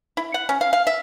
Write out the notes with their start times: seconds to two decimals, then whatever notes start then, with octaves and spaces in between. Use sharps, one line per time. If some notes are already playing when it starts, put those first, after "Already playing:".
0.17 E4
0.34 F#5
0.49 C#4
0.61 F5
0.73 F5
0.87 E5